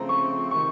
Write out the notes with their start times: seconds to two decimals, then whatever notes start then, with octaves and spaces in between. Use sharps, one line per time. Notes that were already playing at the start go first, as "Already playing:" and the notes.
Already playing: C#3 F3 A3 C4 A#5
0.09 C#6
0.51 C3 D#3 C#6